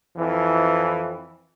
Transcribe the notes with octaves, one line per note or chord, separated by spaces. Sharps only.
F2 E3